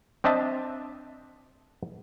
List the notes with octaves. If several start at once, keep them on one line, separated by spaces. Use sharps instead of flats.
C4 D4 D#5 E5 A5